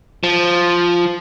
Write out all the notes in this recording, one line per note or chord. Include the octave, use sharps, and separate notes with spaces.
F3